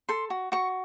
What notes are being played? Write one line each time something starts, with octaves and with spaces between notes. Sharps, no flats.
A4 C6
F#4
F#4 C#6